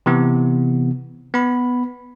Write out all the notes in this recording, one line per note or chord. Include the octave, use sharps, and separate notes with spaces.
C3 E3 B3
B3 B5